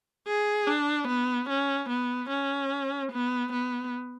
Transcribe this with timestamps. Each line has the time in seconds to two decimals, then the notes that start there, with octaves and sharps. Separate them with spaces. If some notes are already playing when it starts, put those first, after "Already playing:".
0.27 G#4
0.67 D4
1.08 B3
1.49 C#4
1.89 B3
2.30 C#4
3.12 B3
3.52 B3